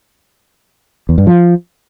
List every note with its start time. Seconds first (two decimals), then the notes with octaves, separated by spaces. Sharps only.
1.09 E2
1.18 G2
1.27 F3